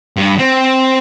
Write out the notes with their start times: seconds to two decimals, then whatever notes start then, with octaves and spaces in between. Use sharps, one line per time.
0.17 G2
0.39 C4